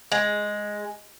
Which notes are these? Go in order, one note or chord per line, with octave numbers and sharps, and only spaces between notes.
G#3